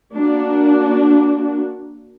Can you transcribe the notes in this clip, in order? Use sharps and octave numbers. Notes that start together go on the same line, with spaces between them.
A#3 D4 F#4